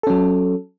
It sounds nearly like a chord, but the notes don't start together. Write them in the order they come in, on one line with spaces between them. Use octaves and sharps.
A4 C#4 F#3